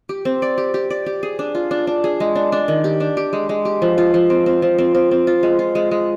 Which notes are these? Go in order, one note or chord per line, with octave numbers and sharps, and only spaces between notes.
G4
C4
D5
G4
G4
D5
G4
G#4
D4
F4
D4
D4
G#4
G#3
D4
D4
D#3
G4
D4
G4
G#3
G#3
G4
F3
F4
F3
C4
C4
F3
C4
C4
C4
F4
G#3
F4
G#3
G#3